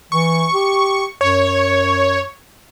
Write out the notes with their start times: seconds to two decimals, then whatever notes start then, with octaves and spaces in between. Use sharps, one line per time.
0.12 E3 C#6
0.54 G4
1.21 F#2 C#5